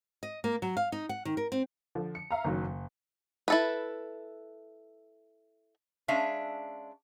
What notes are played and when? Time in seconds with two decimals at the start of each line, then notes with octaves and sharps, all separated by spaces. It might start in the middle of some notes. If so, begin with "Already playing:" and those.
0.23 D#5
0.44 A#3
0.62 F#3
0.77 F5
0.92 D#4
1.09 F#5
1.25 D#3
1.37 A#4
1.52 C4
1.95 D3 F3
2.15 C#7
2.31 E5 F5 A#5
2.44 F#1 D#3 F#3
2.66 F#1
3.48 E4 A4 B4
6.08 G#3 C#4 D4 E5 F5